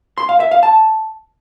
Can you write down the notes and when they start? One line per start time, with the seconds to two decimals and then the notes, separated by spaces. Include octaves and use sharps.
0.18 C6
0.29 F5
0.40 E5
0.51 F5
0.63 A5